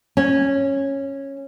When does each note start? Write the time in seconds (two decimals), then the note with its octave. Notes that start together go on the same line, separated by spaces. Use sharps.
0.17 C#4